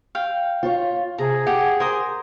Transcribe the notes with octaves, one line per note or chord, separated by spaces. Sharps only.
F5 G5
F4 C#5
C3 G#4 A#5
G4 F#5
A#4 C5 G#5 D#6